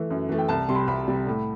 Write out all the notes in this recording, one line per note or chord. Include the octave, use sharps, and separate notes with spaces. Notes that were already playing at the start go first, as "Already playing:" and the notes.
Already playing: E3 A3
F#2
E3 A3
G5
C2 A5
C3 G3 C6
B5
C2 B5
C3 G3
A2